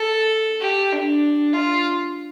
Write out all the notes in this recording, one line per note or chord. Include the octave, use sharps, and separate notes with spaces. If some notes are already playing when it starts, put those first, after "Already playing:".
Already playing: A4
G4
D4
F4